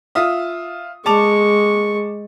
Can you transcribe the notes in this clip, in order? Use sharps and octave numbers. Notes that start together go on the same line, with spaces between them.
F4 E5 D#6
G#3 A5 C#6 D6 F7